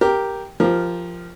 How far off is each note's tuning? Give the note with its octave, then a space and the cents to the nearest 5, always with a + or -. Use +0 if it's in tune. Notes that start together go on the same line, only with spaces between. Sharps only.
G4 +0 A#4 +0
F3 -5 G4 +15 A#4 +0